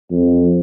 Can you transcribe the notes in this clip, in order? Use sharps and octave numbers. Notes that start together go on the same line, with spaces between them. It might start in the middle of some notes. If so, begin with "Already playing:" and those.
F2